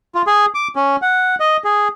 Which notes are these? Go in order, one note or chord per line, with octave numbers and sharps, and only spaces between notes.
F4
G#4
D6
C#4
F#5
D#5
G#4